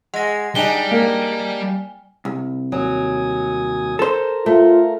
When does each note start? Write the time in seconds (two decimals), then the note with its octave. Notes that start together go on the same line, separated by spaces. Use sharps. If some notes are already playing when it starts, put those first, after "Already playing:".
0.14 G#3 F#5 A#6
0.55 G3 D4 D#4 G5 G#5 G7
0.91 A#3
2.25 C2
2.72 D#2 F#3 G#5 D#6
3.99 A4 A#4 C5
4.46 A3 F4